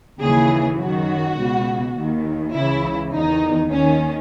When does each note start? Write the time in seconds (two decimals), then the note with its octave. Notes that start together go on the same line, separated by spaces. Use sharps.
0.22 D#2 C#3 E3 G#4
0.79 F#2 D#3 F#4
1.38 C#2 B2
1.97 D#2 D#3
2.55 C#2 C#3 E3 E4
3.13 E2 D#3 D#4
3.71 D#2 D#3 C#4